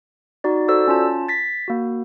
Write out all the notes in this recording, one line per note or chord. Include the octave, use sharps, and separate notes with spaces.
D#4 F#4 D5
F#4 A4 C5 D5 E6
C#4 F4 A5
A6 B6
A#3 F#4